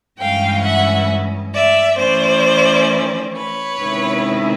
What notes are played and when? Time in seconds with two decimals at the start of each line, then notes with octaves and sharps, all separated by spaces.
0.19 G2 E3 G#3 C#4 F5 G5
0.64 E5 F#5
1.54 D5 E5
1.98 E3 A3 C#4 C5 D5
3.34 B4 C#5
3.79 C3 D#3 G#3 C#4 E4